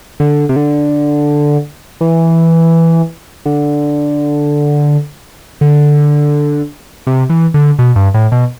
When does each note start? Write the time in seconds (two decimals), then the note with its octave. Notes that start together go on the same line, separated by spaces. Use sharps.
0.20 D3
0.49 C3
0.56 D3
2.01 E3
3.46 D3
5.61 D3
7.07 C3
7.30 E3
7.54 D3
7.79 B2
7.96 G2
8.14 A2
8.32 B2